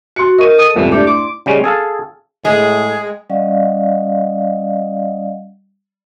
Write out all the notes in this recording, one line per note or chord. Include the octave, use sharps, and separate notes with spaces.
F#4 C6 C#7
A#4 D#5 C#6 D#7
A4 A5 D#6
C2 F2 G#2 E3
A3 D4 E4 G4 D5 E5
C6 D6
C#3 G3 G#3 C#4
G#4 A4 F5 A5
A2 G#3 G#4
G3 C#4 D5 D#5 F5 F#5